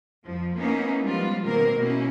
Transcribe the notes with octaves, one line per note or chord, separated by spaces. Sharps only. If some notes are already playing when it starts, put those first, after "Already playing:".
F2 F3
A#3 B3 C#4 D#4 E4
F3 G3 G#3 B3 F4
B2 D#3 A#3 C4 A#4
B2 A#3 C#4 E4